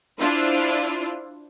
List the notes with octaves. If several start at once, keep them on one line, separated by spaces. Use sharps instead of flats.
D4 E4 F4 C5